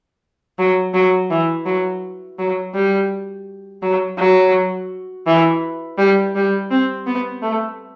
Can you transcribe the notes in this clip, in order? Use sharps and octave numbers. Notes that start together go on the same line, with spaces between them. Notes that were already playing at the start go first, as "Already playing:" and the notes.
F#3
F#3
E3
F#3
F#3
G3
F#3
F#3
E3
G3
G3
C4
B3
A3